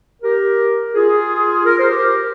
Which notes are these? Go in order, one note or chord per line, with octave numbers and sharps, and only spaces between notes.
G4 A#4
F4 G#4
A#4
C5
G4 A#4